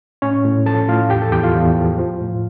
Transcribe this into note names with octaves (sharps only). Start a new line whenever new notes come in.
A2 C#4 C#5
A2
F3 A4 A5
A2 F4 F5
E2 G4 G5
A4 A5
E2 G4 G5
F4 F5
E2
F3
F3
A2